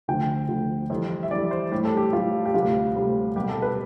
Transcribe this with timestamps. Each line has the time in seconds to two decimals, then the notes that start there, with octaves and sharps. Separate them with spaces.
0.08 D2 D3 F3 G5
0.49 D2 D3 F3
0.90 F2 E3 G3
1.23 E5
1.31 F2 E3 G3 D5
1.51 C5
1.72 A2 G3 G4
1.85 A4
1.97 G4
2.13 A2 G3 F4
2.45 G4
2.54 D2 C3 G3 F4
2.95 D2 C3 G3
3.36 C2 B2 G3 G4
3.49 A4
3.62 B4